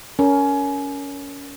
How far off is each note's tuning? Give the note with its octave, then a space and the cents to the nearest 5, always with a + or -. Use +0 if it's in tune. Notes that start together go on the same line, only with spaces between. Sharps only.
C#4 +20 A#4 +0